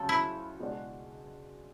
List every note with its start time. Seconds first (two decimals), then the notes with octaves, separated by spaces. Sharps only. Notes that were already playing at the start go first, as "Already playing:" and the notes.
Already playing: D2 C#3 F#3 C#4 A4
0.09 E4
0.59 B2 G#3 D4 F#4